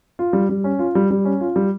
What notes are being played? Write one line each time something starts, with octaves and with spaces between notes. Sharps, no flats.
F4
G3
G3
C#4
F4
G3
G3
C#4
F4
G3